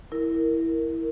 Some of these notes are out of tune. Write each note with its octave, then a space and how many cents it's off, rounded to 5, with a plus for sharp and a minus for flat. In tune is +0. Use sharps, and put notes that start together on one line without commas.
E4 -5 A#4 -5